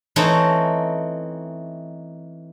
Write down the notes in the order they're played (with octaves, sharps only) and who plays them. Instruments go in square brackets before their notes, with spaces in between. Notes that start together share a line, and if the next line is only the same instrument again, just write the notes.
[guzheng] E3 A3 C4 C#4 D#4